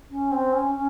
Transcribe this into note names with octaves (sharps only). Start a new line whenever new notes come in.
C#4
C4
C#4
C#4